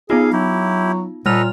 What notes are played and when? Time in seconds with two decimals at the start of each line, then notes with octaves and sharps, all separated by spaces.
0.10 B3 D#4 F4 G#4 F5
0.33 F#3 E4 G4
1.26 A#2 G3 A4 B4 D#5 F6 F7